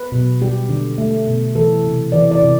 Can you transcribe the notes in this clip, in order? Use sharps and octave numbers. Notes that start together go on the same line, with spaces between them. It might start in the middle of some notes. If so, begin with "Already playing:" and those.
Already playing: B4
B2
G3 G4
D3
A3
B2
E3 A4
C3
E3 D5
D5
C3